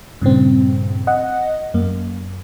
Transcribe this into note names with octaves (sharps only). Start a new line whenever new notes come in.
G2 A#2 C#3 C4
D#5 F#5
F#2 A#3